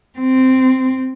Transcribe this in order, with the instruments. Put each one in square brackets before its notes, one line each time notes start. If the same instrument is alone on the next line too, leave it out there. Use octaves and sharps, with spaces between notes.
[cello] C4